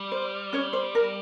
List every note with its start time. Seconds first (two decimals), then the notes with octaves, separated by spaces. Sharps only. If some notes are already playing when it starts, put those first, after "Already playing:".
Already playing: G3
0.12 C5
0.53 C#4 C#5
0.73 C5
0.95 A#4